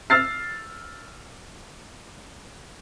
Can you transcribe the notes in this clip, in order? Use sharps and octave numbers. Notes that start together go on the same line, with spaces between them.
E6 F6 A6 C7